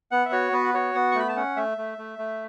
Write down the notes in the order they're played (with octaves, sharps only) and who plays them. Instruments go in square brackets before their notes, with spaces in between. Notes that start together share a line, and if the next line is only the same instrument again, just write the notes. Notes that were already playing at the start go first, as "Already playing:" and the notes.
[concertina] B3 F#5
E5
F#4 C#5
B3 B4
F#4 C#5
B3 F#5
C#6
A3 B5
A5
C#4 F#5
A3 E5
A3
A3
A3